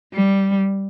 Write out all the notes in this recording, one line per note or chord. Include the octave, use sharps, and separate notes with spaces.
G3